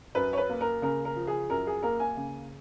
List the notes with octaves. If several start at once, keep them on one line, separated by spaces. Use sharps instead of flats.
F#2 B4
C#5
B4
A#3
A#4
C#3 A#4
A#4
F3
G#4
F#2 A#4
G#4
A#3 A#4
G#5
C#3